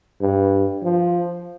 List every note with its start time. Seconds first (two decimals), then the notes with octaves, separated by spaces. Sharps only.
0.21 G2
0.83 F3